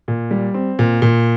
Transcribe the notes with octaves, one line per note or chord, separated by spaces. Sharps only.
A#2
G3
C4
A#2
A#2